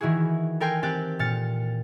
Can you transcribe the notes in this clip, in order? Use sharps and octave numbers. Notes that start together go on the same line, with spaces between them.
D#3 E3 E4 F#4 G#4
A4 A#4 G5 G#5 C6
C4 G4 G5 F#6 A6
A#2 F6 A6 C#7